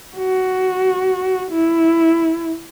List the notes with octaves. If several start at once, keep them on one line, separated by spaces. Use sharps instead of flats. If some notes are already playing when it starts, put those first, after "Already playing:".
F#4
E4